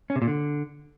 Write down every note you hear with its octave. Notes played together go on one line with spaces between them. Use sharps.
C#4
C3
A#2
D3